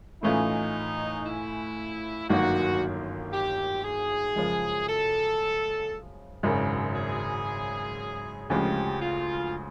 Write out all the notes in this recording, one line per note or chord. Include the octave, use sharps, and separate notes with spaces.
A2 E3 A3 C#4 D#4 F4
E4
G1 F#2 D#3 F#3 A#3 F#4
G4
G#4
F#2 C#3 F3 G#3
A4
G#1 F#2 C#3
G#4
D2 C#3 F3 G#3 G4
F4